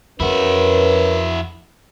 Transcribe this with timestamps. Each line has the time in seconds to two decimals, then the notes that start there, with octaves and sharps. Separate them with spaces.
0.20 F2 C#4 E4 F#4 A#4 B4